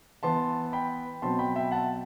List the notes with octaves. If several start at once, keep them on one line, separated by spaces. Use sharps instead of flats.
E3 B3 A5 C6
G5 B5
B2 F#3 C4 A5 C6
G5 B5
E5 G5
F#5 A5